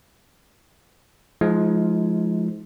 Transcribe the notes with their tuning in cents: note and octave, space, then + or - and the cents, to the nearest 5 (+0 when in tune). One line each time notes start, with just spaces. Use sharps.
F3 +0 G#3 +25 D#4 +40